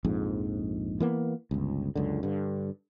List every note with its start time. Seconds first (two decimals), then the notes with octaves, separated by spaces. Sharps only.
0.05 A#1 F2 G#2
1.00 E3 A#3 B3
1.51 G1 C#2
1.95 C#2 F#2 D3
2.23 G2 D3